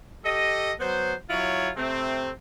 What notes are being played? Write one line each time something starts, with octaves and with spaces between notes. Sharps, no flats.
G4 A4 D#5
F#3 B3 C5
F#3 E4 F4 C#5
C3 A3 C4